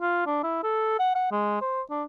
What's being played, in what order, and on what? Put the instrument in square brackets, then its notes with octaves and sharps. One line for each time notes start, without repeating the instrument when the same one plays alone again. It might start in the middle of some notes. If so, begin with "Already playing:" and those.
[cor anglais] F4
D4
E4
A4
F#5
F#5
G#3
C5
D4